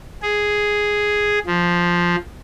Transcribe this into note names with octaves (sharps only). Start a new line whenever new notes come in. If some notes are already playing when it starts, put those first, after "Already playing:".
G#4
F3